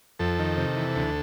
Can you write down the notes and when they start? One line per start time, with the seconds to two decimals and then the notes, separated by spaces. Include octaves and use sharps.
0.19 F2 A4
0.39 D#3
0.57 C3
0.76 E3
0.96 D2